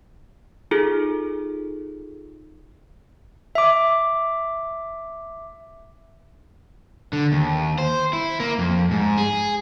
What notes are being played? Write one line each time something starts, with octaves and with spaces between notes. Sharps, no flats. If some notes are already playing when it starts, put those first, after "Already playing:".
D#4 F4 G#4 A4
E5 D6
D3
D#2
C5
E4
A#3
F2
G#2
G#4